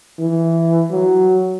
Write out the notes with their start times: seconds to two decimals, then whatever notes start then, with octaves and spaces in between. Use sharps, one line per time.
0.19 E3
0.91 F#3